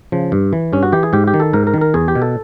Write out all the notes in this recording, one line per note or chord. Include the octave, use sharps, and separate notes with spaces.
C#3 F3
G2
E3
G2 C#4
F#4
E3 G4
G#4
G#2 G4
G4
D#3
A4
G#2 A#4
A#4
D#3
A#4
E2 G#4
G4
B2
A4